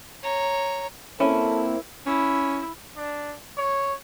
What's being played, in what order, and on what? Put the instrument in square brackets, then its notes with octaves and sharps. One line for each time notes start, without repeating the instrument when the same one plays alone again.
[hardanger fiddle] C#5 A#5
[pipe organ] A#3 C4 [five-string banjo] C#4 [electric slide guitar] E4 [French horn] A4
[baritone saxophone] C#4 [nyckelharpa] E4
[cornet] D4
C#5